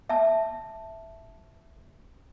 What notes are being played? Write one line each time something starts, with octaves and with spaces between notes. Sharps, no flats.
E5 A5